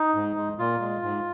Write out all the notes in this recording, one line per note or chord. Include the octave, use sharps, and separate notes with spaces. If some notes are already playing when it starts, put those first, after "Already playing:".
Already playing: D#4
G#2
G#3
A#2 F4
G#3
G#2